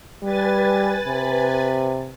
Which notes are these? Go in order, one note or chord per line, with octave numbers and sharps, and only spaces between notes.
G3 B4 G#5 A6
C3